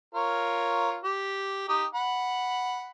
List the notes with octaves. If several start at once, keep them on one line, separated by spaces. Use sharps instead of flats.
F4 A#4 C#5
G4
D#4 G4
F#5 B5